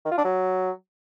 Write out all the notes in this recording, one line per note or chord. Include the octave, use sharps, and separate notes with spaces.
D#3
F4
D4
F#3